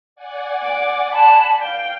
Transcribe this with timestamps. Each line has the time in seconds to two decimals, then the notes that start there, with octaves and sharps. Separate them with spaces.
0.16 D5 F#5 G#5
0.63 D6
1.13 A5 B5
1.62 F5 G5